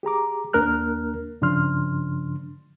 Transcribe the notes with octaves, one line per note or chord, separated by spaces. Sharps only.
G4 G#4 A#5 D6
D#2 A#3 D4 A#4 F6 F#6
G2 C#3 F3 D4 C6 F6